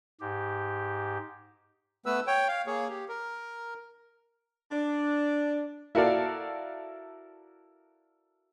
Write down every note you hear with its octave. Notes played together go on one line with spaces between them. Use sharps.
G#2 G4
A3 B3 B4 E6
C#5 G5
F5
A#3 G#4 C#5
G4
A#4
D4
E4 F#4 A4 A#4 D5 F5